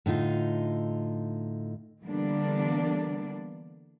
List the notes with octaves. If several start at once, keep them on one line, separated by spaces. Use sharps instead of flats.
A2 D3 D#4 F4
D3 E3 G3 A#3 B3 D4